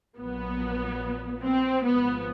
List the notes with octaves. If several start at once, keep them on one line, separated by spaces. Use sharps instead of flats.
A#1 A#2 F#3 B3
C4
G#1 G#2 F3 B3